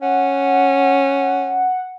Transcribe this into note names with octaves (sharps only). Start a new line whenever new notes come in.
C#4 F#5